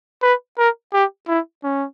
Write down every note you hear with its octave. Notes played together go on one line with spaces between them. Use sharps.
B4
A#4
G4
E4
C#4